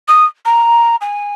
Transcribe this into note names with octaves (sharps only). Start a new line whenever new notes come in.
D#6
A#5
G#5